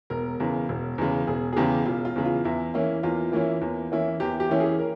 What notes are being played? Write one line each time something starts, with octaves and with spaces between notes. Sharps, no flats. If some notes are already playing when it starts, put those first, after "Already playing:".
E1 A#4
E2 C#3
E1
E2 C#3
E1 G#4
G#4
E2 C#3 G4
E1 F4
F4
E2 C#3
F4
E2 E4
E3 A#3 C#4 E4
E2 F4
E3 A#3 C#4 E4
E2
E3 A#3 C#4 E4
E2 G4
G4
E3 A#3 C#4 E4
G#4
A#4